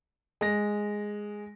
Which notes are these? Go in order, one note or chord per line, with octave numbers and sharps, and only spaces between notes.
G#3 A#6